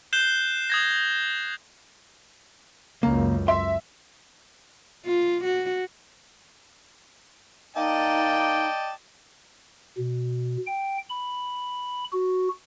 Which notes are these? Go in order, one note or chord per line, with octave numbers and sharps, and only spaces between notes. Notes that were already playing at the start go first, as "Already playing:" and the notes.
F#6 G6 C7 E7 G7
D#6 G#6 A#6
C#2 F#2 C#3 A#3
E5 C6
F4
F#4
A#3 D#4 D5 D#5 G5 A5
B2
G5
B5
F#4